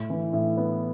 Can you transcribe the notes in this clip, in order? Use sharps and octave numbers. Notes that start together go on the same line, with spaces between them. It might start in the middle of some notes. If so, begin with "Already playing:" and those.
Already playing: A2
E3
A2
B3